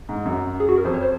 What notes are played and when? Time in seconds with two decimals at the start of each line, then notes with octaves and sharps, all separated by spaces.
0.09 G#2
0.25 F#2
0.60 G#4
0.69 F#4
0.78 A#4
0.84 F2 C5
0.94 C#5
1.02 C5